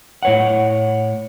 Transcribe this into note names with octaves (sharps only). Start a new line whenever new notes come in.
A2 C#5 F#5